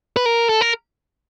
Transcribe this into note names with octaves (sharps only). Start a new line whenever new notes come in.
B4
A#4
A4
A#4